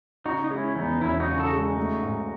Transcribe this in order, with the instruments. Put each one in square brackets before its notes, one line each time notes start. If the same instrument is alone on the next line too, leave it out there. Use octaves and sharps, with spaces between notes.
[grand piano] C#3 [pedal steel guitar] D#4 F#4
[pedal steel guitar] D#4
[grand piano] G#3 [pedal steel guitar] C#4 E4
[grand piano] E2 [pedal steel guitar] B3 D#4
[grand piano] E1 [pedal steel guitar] C#4 E4
[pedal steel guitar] D#4 F#4
[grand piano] C#3
[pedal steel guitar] F#4 A4
[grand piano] G#3
[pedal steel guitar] D#4 F#4
[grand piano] A3
G#2